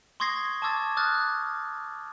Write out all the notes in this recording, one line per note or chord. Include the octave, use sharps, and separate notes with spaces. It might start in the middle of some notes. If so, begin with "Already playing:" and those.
C6 C#6 D#6 G#6 A#6 C7
A5 C#6 D6 E6 G#6 A6
D6 D#6 F6 F#6 A6